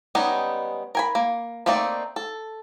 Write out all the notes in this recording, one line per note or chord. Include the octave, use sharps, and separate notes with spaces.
G3 G#3 B3 C#4 D#4
A#4 G#5 B5
A#3
A3 A#3 C4 D#4 D5
A4